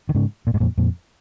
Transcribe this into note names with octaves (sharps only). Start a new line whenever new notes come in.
D#3
G#2 C#3
A#2
G#2
F2 A#2
F2 A#2